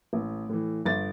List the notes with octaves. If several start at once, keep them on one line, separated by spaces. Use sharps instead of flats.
A1
A2 E3
G1 A6